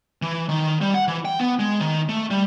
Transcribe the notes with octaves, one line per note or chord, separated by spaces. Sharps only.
E3
D#3
G3
F#5
E3
G5
B3
G#3
D#3
A3
G3